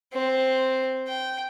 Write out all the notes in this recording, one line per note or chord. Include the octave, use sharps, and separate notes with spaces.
C4
G5